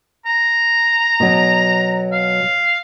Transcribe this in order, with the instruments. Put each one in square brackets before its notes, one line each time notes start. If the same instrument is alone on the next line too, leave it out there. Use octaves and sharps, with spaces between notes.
[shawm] A#5
[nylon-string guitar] B2 F#3
[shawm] F5